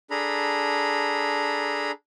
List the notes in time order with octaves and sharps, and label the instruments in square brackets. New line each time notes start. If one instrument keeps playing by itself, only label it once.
[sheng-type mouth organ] D4 G#4 A4 A#5 B5